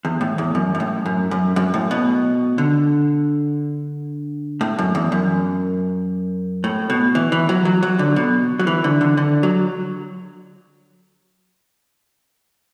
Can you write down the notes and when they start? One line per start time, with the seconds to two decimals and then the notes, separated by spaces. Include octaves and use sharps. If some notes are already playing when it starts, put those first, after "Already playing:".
0.05 E2
0.21 A2
0.38 E2
0.55 F#2
0.75 F#2
0.80 A2
1.06 F#2
1.31 F#2
1.56 F#2
1.74 A2
1.91 B2
2.58 D3
4.61 A2
4.78 F#2
4.95 E2
5.12 F#2
6.64 A2
6.90 B2
7.15 E3
7.32 E3
7.49 F#3
7.65 F#3
7.83 F#3
7.99 D3
8.16 B2
8.59 F#3
8.67 E3
8.84 D3
9.01 D3
9.17 D3
9.43 F#3